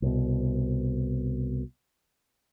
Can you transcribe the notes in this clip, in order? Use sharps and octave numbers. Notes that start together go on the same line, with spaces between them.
C2 B2